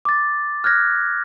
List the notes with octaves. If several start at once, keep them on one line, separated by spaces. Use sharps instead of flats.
D6 A6
F6 F#6 G#6 A#6